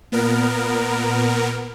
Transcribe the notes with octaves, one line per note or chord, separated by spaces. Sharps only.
A#2 B3 A#4